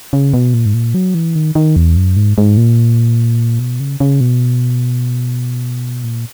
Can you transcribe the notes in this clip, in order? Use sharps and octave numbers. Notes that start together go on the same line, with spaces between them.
C#3
B2
A#2
G#2
A#2
F#3
E3
D#3
D#3
E2
F#2
G#2
G#2
A#2
B2
C#3
C#3
B2
A#2